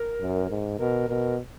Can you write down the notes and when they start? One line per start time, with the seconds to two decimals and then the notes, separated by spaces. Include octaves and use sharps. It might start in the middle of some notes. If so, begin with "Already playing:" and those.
Already playing: A#4
0.21 F#2
0.50 G#2
0.79 B2 A#4
1.09 B2 A#4